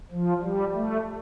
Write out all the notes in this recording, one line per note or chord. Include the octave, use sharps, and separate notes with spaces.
F3
G3
A3